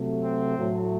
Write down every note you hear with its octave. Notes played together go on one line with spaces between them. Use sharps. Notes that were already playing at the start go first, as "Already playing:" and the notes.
Already playing: C3 F#3 A3
C4
A2 F#3 A3